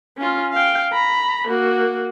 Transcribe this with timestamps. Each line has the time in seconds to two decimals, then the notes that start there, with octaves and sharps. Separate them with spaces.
0.18 C#4 F4
0.53 F5 G5
0.93 A#5 B5
1.48 A#3 F#4